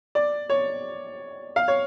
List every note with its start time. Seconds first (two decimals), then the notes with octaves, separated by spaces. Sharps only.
0.15 D5
0.49 C#5
1.56 F5
1.68 C#5